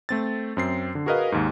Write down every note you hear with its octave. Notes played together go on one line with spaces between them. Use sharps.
A3 C4 A6
F#2 C4 C7
D3
F#4 G#4 A#4 B4 D#5 F5
D#2 G#2